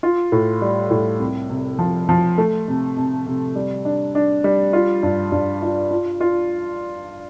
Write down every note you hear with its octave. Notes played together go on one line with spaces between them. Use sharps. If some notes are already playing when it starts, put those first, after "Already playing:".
F4
A2
G3
A2
C2
C3
F3
F3
A3
C3
C3
C3
G3
D4
D4
G3
F4
G2
G2
F4
F4
F4